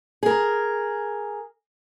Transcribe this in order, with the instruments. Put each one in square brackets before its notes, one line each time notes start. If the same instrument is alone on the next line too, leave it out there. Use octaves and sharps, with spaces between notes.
[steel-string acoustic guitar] G#4 A#4